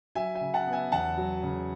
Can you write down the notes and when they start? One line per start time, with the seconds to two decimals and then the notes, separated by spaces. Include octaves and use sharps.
0.15 F#3 E5 G#5
0.35 E5 G#5
0.41 C#3
0.54 F#5 A5
0.67 B3
0.73 E5 G#5
0.92 E2 F#5 A5
1.17 F#3
1.43 C#3